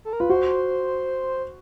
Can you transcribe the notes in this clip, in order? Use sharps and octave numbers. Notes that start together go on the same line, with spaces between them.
A4
A#4
F4 B4
F#4 C5